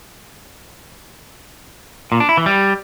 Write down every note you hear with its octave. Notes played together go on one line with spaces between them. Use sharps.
A#2
D4
E4
E3
G3